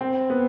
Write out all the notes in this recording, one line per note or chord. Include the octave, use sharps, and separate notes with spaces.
C4
B3